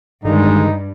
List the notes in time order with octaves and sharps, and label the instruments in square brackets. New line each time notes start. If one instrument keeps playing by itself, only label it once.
[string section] G2 [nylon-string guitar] D3 D#3 G3 [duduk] G#3 [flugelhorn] D#4